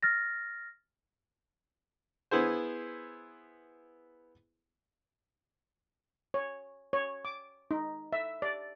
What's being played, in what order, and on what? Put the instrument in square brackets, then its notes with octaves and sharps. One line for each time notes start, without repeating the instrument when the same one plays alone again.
[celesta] F6 A6 A#6
[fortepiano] B3 E4 G#4 C5
[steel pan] C#5
C#5
D6
D#4
E5
D5